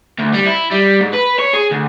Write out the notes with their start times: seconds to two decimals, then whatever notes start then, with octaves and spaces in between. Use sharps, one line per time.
0.18 D2
0.34 G3
0.46 E4
0.71 G3
1.01 G#2
1.14 B4
1.39 C#5
1.54 G#4
1.72 D2